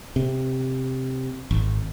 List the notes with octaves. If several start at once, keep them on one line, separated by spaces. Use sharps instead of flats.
C3
G#1